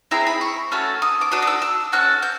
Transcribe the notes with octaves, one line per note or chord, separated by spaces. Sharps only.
C4 E4 G#4 A#5
B5
C#6
A3 C#4 F#4 A4
D#6
D6
D4 F#4 A4 D#6
D#6
E6
E6
C#4 F#4 A4 F#6
G6